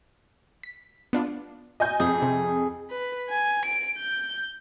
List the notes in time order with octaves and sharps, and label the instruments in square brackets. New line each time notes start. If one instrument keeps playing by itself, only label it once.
[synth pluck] B6
B3 D4 F4
[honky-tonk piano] D#5 G#5 G6
[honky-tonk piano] F2 [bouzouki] G#4
[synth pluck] C3
[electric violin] B4
G#5
D7
G6